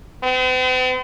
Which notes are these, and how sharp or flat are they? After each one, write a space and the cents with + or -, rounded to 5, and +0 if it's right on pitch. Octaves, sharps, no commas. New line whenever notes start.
C4 -45